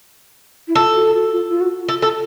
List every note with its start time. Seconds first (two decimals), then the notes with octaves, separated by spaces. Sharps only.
0.68 E4
0.76 F4 A4
0.94 F#4
1.14 F#4
1.32 F4
1.50 F4
1.61 F#4
1.89 F4 A4
2.02 A4